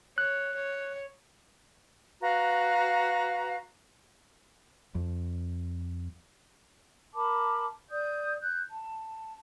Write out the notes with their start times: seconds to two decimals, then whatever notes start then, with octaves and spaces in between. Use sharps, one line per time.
0.18 C#5 F#6
0.55 C#5
2.21 F#4 B4 F5 A#5
4.95 F2
7.14 A#4 A5 B5 D6
7.89 D5 D#6 G6
8.39 F#6 G6
8.70 A5